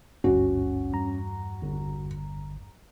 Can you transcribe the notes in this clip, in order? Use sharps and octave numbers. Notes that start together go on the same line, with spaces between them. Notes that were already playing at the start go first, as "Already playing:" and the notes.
G#1 D2 G2 C#4 F#4
E2 G2 A#5
G1